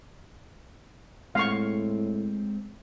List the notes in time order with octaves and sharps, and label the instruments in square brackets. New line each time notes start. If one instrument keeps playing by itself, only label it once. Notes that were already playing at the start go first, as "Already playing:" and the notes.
[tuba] A2 [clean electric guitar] G#3 C4 [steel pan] F5 C#6